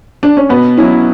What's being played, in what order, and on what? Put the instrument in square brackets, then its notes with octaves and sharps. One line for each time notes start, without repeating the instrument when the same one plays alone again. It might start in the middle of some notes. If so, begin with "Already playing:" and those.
[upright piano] D4
C#4
[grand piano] B2 [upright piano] B3
[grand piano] F#3 C#4 E4